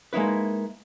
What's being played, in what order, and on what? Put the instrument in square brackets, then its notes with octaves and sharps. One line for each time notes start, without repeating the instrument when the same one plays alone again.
[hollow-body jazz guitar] G#3 A#3 D#4 E4 B4